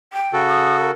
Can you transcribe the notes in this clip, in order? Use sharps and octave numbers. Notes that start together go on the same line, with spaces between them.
G5
C#3 F#4 A4
D#6
A#4